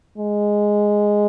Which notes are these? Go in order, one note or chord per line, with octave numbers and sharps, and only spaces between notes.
G#3